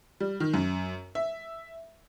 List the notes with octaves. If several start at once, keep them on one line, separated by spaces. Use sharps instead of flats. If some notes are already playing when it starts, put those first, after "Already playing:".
G3
D#3
F#2
E5